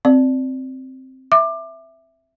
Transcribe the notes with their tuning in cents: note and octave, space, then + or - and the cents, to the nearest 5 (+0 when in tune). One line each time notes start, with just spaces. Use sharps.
C4 +0 D5 +0
E5 +0 D6 +25